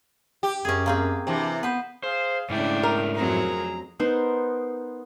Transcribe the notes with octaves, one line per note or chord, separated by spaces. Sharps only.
G4
F#2 C#4 G#4
A#3 C4 G#4
C3 E3 D4
B3 B4 C5
G#4 C5 F5
G#2 C#3 A3 D4 E4 D5 G5
A#4
F2 F#3 C4 G#4 A#5
B3 D#4 A#4 C5